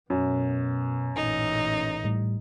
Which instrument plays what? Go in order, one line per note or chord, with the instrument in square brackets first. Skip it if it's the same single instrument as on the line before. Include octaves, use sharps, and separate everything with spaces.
[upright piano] F#2 [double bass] B2
[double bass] A1 A#2 [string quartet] D#4
[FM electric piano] A2 G3